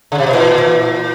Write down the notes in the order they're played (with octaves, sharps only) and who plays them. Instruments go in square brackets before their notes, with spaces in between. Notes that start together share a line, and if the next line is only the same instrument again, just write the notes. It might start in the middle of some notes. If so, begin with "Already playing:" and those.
[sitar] C#3
C3
B2
[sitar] A#2 [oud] E3
[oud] E3